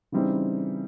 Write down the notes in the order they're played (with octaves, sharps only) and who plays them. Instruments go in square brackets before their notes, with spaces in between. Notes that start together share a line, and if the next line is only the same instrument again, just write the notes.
[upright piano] C#3 E3 G3 C4 D#4